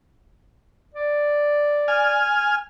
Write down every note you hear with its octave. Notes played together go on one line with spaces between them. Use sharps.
D5
G#5 F6